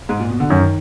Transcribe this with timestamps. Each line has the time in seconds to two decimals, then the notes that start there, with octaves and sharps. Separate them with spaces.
0.09 G#2
0.20 A#2
0.30 B2
0.40 D3
0.50 F#2 D#3